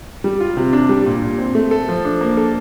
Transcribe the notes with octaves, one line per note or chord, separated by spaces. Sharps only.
G3
F4
C3
D4
G3
A#2
A#2
C4
A3
A4
F3
D4
A#3
A4